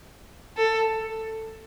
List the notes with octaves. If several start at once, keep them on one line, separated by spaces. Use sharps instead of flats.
A4